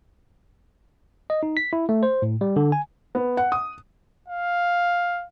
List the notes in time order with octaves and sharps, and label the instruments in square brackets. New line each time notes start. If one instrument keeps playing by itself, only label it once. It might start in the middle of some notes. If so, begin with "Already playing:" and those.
[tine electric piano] D#5
D#4
B6
E4
A3
C5
A2
G3
D3
G#5
[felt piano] B3
F#5
D#6
[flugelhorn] F5